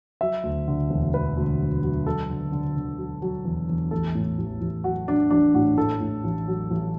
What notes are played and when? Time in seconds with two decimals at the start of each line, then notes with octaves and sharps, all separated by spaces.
0.21 F#3 E5
0.43 D2
0.68 D3
0.90 E1
1.13 E1 B4
1.37 D2
1.60 F#3
1.83 F#3
2.07 F#3 A4
2.30 D3
2.52 D3
2.76 D3
2.98 F#3
3.22 F#3
3.45 E2
3.69 E2
3.91 A1 A4
4.15 A2
4.38 A1
4.61 A1
4.84 F#3 F#4
5.07 F#3 D4
5.31 A1 D4
5.55 A2 F#4
5.77 A2 A4
6.01 A2
6.24 A1
6.47 F#3
6.71 A1